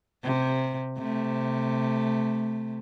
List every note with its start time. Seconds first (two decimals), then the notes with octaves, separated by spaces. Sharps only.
0.24 C3
0.98 C3 A3